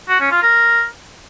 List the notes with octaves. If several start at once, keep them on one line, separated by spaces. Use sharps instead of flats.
F#4
C#4
F4
A#4